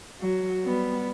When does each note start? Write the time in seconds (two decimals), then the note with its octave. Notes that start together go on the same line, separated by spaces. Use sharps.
0.20 F#3
0.64 G3 B3